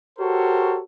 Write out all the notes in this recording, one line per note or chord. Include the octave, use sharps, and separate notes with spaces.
F#4 G4 A4 A#4 C5 C#5